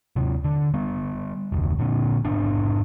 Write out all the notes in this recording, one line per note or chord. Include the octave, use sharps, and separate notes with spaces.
D#2 C3
D3
G3 B3
F1 D2
A#2 D3
G#2 C3 B3 D4